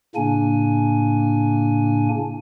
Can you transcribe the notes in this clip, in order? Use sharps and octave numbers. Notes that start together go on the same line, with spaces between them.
A2 C#3 A#3 D4 G#5